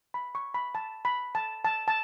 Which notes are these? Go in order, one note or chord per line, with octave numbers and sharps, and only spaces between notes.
B5
C#6
B5
A5
B5
A5
A5
A5